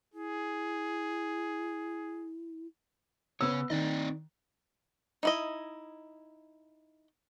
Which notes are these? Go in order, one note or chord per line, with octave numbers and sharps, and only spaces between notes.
E4 G#4
C#3 B3 C#5 E6
D#3 C4 D5 D#5
D#4 E4 D#5